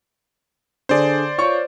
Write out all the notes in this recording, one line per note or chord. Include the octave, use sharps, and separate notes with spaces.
D3 G#4 C5 D5
F4 C#5 C#6